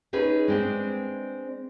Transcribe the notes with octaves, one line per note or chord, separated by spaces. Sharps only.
C#4 D#4 G#4 B4
G#3 C4 D4